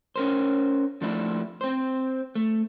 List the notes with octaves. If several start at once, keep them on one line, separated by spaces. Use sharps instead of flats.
C#4 A#4 C5
F3 A3 D4 E4
C4 C5
A3